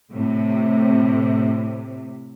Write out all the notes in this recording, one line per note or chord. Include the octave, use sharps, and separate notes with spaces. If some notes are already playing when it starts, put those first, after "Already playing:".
A2 C3